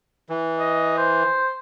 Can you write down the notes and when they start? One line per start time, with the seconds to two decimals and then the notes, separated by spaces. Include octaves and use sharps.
0.29 E3
0.59 D#5
0.98 C5